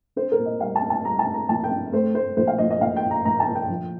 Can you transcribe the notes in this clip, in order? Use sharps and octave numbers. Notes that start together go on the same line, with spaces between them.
C4 C5
A#4
A#2
D#5
G3 F5
A5
C4
A5
G3 A#5
A5
C4
A#5
A#1 A5
G5
C4
A3 C5
A3 C5
A#1 C5
F5
A#1 D#5
D#5
A#1 F5
G5
A#2
A#5
A#1 A#5
A5
A#2
G5
F3